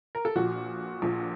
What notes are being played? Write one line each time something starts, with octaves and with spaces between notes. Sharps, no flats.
A#4
A4
A#1 A#2 F3 F#4
A#1 A#2 F3